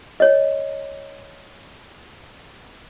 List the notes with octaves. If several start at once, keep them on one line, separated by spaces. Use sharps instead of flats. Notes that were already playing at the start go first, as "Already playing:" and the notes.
C#5 D#5